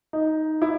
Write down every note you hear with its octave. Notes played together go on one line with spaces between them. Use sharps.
D#4
E4